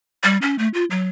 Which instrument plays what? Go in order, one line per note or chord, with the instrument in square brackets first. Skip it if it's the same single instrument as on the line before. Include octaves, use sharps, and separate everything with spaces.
[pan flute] G3
C#4
A3
F4
F#3